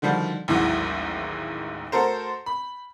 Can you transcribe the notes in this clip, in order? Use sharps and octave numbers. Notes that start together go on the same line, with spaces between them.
D3 D#3 F3 G3 F#4
A1 D#2 G#2 E3 F#3
A3 F#4 A4 A#4 C5
B5